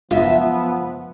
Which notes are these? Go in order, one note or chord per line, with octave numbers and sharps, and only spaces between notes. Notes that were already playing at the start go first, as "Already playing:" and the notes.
F#2 F3 B3 F4 E5